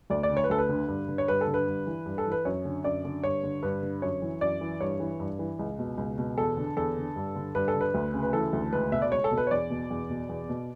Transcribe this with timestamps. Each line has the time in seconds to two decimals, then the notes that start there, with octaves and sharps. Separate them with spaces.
0.10 D2 D5
0.23 D5
0.30 D3
0.37 C#5
0.44 B4
0.50 D2 A4
0.58 B4
0.69 D3
0.88 G2
1.08 D3
1.18 C#5
1.28 G2 B4
1.41 A4
1.47 D3
1.54 B4
1.67 G2
1.87 E3
2.06 G2
2.18 A4
2.26 E3
2.32 B4
2.45 F#2 C#5
2.65 D3
2.84 F#2 D5
3.04 D3
3.23 G2 C#5
3.43 D3
3.63 G2 B4
3.82 D3
4.02 F#2 C#5
4.22 E3
4.41 F#2 D5
4.61 E3
4.80 G2 C#5
5.00 E3
5.20 G2
5.39 E3
5.59 C#2
5.79 B2
5.97 C#2
6.18 B2
6.37 E2 A4
6.57 D3
6.77 E2 A4
6.97 D3
7.16 G2
7.36 D3
7.55 G2 B4
7.68 A4
7.74 D3
7.81 B4
7.94 D2
8.14 C#3
8.23 B4
8.33 E3 A4
8.53 D2
8.72 C#2 B4
8.92 B2 E5
9.02 D5
9.12 C#2 C#5
9.24 A4
9.31 B2
9.37 B4
9.47 C#5
9.51 E2 D5
9.70 B2
9.90 E2
10.10 B2
10.29 E2
10.49 B2